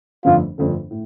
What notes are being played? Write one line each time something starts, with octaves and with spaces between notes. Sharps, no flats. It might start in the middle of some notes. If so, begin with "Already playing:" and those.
G1 F2 D3 A3 F4
G1 F2 D3 A3
A2